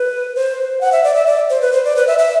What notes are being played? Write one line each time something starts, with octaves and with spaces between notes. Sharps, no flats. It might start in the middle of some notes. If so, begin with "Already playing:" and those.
Already playing: B4
C5
F#5
E5
D5
E5
D5
C5
B4
C5
D5
B4
E5
E5